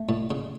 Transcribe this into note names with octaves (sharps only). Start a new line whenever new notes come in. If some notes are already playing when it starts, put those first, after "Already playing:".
Already playing: A3
A2
C#3